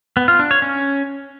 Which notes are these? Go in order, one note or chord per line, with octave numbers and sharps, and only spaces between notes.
B3
F4
D4
C#5
C#4